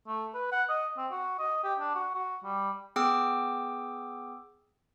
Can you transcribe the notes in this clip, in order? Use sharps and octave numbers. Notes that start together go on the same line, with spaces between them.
A3
B4
F#5
D#5
C4
F#4
D#5
G4
D4
F#4
F#4
G3
B3 G#4 G5 D6 E6